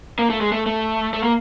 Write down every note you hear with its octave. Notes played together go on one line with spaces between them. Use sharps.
A#3
A3
G#3
A3
A3
A3
A#3